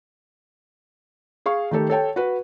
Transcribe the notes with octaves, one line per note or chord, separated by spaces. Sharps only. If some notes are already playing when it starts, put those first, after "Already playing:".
G#4 F5 C#6
D#3 A3 G4 A4
A4 C#5 G5 A5
F#4 B4